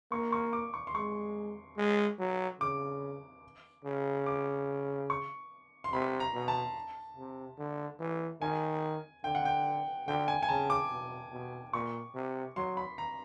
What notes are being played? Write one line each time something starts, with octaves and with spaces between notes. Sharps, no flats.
A#3 C#6
C#6
D6
C#6
C6
G#3 C#6
G#3
F#3
C#3 D6
C#3
D6
C#6
C6
C3 B5
A#5
B2
A5
C3
D3
E3
D#3 G#5
D3 G5
F#5
G5
D3 G5
G#5
G#5
C#3 A5
D6
B2
B2
A#2 C#6
C3
F#3 C6
B5
A#5